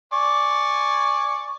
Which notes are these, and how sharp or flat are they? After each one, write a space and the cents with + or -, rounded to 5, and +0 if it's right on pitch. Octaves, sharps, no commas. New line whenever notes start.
D5 +0 G#5 +0 C#6 +0